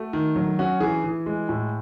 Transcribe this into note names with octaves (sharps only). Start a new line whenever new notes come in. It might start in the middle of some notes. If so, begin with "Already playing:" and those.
Already playing: A3 F#4
D#3
F#3
C#4 F#4
E3 G#4
E3
G#3
A2